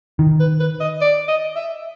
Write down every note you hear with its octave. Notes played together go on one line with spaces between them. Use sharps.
D#3
B4
B4
D#5
D5
D#5
E5